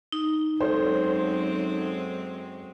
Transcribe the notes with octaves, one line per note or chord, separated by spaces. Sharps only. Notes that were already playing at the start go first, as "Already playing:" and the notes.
D#4
F#2 G#3 C4 A4 C5 C#5